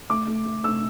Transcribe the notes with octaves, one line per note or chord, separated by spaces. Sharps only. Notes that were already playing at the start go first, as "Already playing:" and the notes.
A3 D6
A3
A3
A3 E6